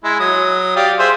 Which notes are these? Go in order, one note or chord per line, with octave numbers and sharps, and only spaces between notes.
G#3 E4
F#3 D#6
G4 D5 F5
G#4 C5 E5